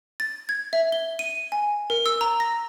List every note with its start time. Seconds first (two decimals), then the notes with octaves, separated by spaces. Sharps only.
0.20 A6
0.49 G#6
0.73 E5
0.92 G7
1.19 D#7
1.52 G#5
1.90 A#4
2.06 E6
2.21 A#5
2.40 A#6